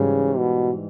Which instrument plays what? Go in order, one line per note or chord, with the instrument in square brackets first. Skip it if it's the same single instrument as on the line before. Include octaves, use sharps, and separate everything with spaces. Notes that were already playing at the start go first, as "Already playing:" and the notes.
Already playing: [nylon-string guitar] G#2 E3 G3 [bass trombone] C#3
[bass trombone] B2